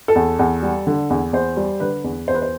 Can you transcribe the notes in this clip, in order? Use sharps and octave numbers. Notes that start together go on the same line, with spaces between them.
A4
E2
E2
G3
D3
E2
E2 C5
G3
D3 B4
E2
E2 C5
B4
C5